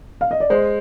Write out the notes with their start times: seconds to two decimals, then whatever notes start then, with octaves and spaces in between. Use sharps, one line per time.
0.21 F5
0.31 D#5
0.40 D5
0.50 G#3 C5